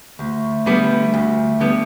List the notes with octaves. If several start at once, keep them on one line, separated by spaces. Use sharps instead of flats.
D2 A3
D3 G3 B3
D2
D3 G3 B3